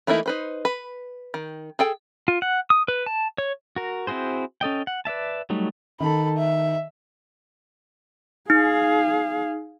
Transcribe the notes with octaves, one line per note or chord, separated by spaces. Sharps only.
E3 A3 A#3 D#4 E4
D#4 B4 C5
B4
D#3
G#4 A4 G5
F4
F#5
D#6
B4
A5
C#5
F#4 A#4
C4 E4 F#4 G#4 C5
C#4 A4 D#5 G5
F#5
B4 D5 E5 A5
F#3 G3 A3 D#4
D#3 A4 B5
E5
D#4 G#4 F5